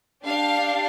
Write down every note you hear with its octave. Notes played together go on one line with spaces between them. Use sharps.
D4 G4 F5